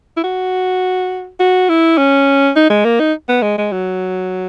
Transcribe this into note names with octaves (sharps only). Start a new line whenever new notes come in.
E4
F#4
F#4
E4
C#4
D#4
G#3
A#3
D#4
B3
G#3
G#3
F#3